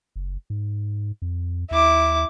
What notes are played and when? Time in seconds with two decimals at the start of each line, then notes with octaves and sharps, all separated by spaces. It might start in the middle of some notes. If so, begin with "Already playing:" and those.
0.16 F#1
0.50 G#2
1.22 F2
1.71 D#2 E4 D6